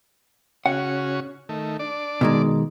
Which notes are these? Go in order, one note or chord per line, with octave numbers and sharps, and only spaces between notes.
C#3 C#4 F#4 F#5
D#3 A3
D4 D5
B2 D#3 G#3